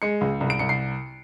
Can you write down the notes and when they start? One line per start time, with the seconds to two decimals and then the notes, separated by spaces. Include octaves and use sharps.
0.02 G#3 C#7
0.21 C#2
0.41 C2
0.50 D7
0.59 C2 C#7
0.69 C7